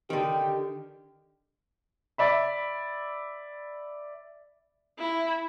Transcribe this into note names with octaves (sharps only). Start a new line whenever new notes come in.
D3 D#3 G4
D5 E5 B5
E4